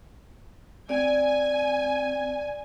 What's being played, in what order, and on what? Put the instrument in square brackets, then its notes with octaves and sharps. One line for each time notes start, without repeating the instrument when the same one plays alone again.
[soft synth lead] C4 [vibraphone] D5 [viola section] G#5